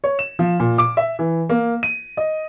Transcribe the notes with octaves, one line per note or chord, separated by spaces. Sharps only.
C#5
E7
F3
A#2
D6
E5
E3
A#3
D#7
D#5